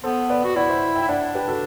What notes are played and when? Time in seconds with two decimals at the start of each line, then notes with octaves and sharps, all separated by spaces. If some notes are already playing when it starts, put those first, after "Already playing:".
0.04 B3 A4 C5
0.30 B4 D5
0.44 F#4
0.56 E4 D5 F#5
0.69 C5 E5
0.95 E5 G5
1.02 E4
1.09 D4 D5 F#5
1.35 G4 B4
1.48 F#4 A4